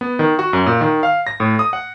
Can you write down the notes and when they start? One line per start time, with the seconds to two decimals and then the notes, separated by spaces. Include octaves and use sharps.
0.01 B3
0.19 D#3
0.39 F#4
0.53 F#2
0.66 A#2
0.81 D#3
1.03 F5
1.27 A#6
1.40 A2
1.59 D#6
1.73 F#5